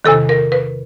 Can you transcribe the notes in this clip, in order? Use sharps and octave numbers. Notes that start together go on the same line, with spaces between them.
E2 C3 D#3 A4
A#4
B4